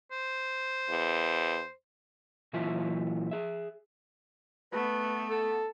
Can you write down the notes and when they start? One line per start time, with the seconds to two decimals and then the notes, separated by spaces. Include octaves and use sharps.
0.12 C5
0.90 E2
2.53 A#2 E3 F#3 F4 E5 G#5
3.31 G#4 E5
4.73 A3 B3 B4
5.29 A4